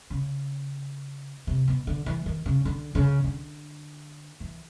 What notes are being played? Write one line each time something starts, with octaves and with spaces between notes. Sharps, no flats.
C#3
C3
B2
D3
E3
D#3
C#3
D3
C#3
D3
E3